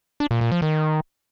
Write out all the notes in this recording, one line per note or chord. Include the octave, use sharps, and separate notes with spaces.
D4
A#2
A#2
F3
D#3